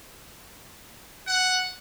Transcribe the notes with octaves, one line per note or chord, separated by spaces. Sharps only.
F#5